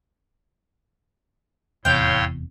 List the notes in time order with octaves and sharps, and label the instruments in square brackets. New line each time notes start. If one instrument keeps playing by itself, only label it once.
[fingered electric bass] F1 E2 C3 [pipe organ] A2 C#5 C6 [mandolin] F5 G5